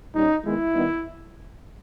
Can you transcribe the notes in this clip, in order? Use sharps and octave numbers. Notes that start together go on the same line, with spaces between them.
A#2 G3 C#4 D#4
D#3 G#3 B3 E4
D#3 G3 B3 D#4